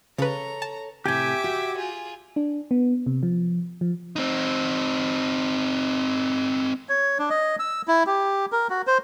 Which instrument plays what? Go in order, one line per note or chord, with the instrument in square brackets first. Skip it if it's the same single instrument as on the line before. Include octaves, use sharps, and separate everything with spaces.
[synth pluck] C#3 B4 [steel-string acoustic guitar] A4 C#5 [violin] A#5
[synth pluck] A5
[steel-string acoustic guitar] A2 C3 [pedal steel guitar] G4 G5 G#5 [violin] E5 D6
[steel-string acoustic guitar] F#4
[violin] F4 G#4
[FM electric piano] D4
B3
C3
F3
F3
[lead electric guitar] C4 D#4
[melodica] C#5
D4
D#5
E6
E4
G4
A#4
F#4
C5